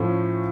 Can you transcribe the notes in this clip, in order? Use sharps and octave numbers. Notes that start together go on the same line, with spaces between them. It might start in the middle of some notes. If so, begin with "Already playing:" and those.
Already playing: A2 F3 A3 C#4